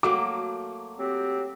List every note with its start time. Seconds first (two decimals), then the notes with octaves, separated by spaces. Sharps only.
0.03 F#3 A3 A#3 D6
0.99 F#3 C4 G4